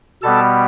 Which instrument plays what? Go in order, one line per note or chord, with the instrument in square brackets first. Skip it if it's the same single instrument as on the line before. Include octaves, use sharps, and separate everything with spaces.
[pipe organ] B2 G3 B3 A4 A5